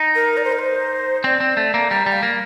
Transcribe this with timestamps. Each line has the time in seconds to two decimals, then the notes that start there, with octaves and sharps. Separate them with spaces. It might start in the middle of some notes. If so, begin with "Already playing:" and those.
Already playing: D#4
0.15 A#4
0.37 D5
0.45 C5
0.52 A#4
0.59 C5
1.24 C4 D5
1.40 C4
1.57 A3
1.74 A#3
1.90 G3 A#5
2.06 G3
2.12 F5
2.23 A#3